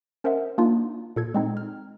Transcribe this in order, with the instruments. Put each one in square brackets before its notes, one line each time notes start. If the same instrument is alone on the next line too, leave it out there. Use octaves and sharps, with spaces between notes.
[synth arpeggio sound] C#4 A#4 C5 D#5 E5 F#5
A#3 D4 D#4 F4
A#2 A4 G#6
G#3 C4 D#4
F6